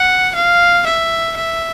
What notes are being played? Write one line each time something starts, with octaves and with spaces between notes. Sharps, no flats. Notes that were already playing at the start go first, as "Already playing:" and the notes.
Already playing: F#5
F5
E5
E5